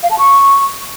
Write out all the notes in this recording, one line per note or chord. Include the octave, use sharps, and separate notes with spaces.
F5
A5
C#6